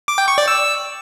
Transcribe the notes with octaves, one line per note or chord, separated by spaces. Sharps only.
D6
G5
C#6
D5
E6